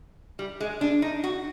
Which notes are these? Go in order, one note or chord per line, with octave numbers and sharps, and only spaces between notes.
G3
G#3
D4
D#4
F#4